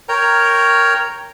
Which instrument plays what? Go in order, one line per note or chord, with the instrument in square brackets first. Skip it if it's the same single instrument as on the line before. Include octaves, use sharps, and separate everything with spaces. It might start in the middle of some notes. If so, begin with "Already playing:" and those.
[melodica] A#4 C#5 G5 A#5